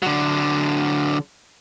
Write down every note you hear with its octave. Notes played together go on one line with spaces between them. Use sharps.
D3 F#3